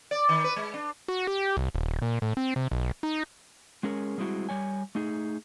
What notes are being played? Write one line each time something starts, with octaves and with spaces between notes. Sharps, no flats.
D5
D#3
B4
G#3
D4
F#4
G4
C2
D#1
A#2
A2
C4
C3
B1
D#4
G#3 C#4 G#4 A#4 C#5
G3 G#3 C4 E4 F#4
G3 C#5 G#5
A3 D#4 G#4